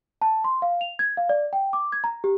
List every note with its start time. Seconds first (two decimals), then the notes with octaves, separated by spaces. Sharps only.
0.22 A5
0.44 C6
0.62 F5
0.81 F7
0.99 G#6
1.17 F5
1.29 D5
1.53 G5
1.73 D6
1.92 G#6
2.04 A#5
2.24 G4